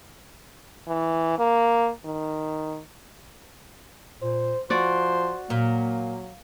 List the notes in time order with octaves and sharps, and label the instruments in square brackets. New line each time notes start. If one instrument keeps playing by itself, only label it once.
[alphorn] E3
A#3
D#3
[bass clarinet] A#2 [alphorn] C5
[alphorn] F3 [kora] F#4 D5 [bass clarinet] C5
[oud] A#2 [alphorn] F#3 [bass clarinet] A#3